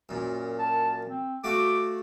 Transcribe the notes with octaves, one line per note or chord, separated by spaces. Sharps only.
F#2 A#2
A5
C4
A3 F#4 F5 D6